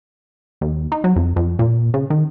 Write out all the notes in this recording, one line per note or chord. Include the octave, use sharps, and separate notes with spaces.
D#2
D#4
F#3
F2
F2
A#2
C#3
D#3